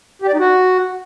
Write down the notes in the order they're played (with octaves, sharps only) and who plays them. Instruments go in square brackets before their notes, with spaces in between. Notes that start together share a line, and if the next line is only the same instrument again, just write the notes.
[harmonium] G4
D5
D#4
F#4